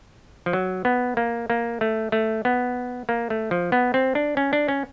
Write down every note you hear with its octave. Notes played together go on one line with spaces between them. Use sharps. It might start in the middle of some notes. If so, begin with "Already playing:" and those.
F3
F#3
B3
A#3
A#3
A3
A3
B3
A#3
A3
F3
B3
C4
D4
C#4
D4
C#4